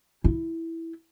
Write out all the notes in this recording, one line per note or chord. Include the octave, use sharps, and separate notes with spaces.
E4